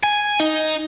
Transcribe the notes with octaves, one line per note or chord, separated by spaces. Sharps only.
G#5
D#4